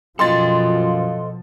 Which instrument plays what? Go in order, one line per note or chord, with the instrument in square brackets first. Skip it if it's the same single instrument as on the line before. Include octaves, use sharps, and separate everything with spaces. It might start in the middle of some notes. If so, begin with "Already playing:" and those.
[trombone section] F#2 F4 [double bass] B2 F3 [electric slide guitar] A4 D#5 [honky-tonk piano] C6 A6